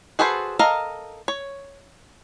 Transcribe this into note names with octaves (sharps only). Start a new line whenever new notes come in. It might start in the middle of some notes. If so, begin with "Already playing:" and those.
F#4 G#4 A4 B4 C5
A4 A#4 D#5 F5 A#5
C#5